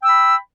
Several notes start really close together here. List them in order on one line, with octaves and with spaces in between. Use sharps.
G5 E6 B5